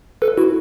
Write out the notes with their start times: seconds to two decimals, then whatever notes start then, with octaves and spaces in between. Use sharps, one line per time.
0.22 A4 B4
0.38 E4 F#4